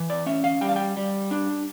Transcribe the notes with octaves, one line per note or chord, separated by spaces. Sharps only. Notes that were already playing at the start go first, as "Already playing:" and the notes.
Already playing: E3
D5
C#4 E5
F5
G3 G5
F5
G5
G3
D4